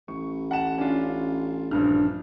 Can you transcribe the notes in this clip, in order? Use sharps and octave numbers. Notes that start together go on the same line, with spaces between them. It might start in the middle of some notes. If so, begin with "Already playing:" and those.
A1 C#6
F#5 A5 E7
C#4 D4 F4
A#1 G2 D4 F6